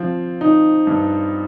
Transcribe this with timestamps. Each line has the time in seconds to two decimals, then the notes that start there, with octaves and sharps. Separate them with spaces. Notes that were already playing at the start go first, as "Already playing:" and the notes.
Already playing: F3 C4
0.41 D#4
0.87 G2